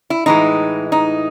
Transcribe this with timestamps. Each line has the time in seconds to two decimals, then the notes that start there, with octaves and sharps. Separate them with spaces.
0.10 E4
0.26 A2 E3 G#3 D#4
0.92 D#4